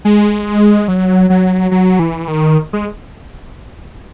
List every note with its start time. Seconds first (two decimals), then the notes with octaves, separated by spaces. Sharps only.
0.05 G#3
0.88 F#3
1.30 F#3
1.71 F#3
1.99 E3
2.28 D#3
2.73 G#3